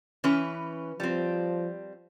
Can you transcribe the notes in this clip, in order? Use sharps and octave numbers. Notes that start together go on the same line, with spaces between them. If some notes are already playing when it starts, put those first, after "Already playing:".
E3 C#4 B4
F3 G3 C4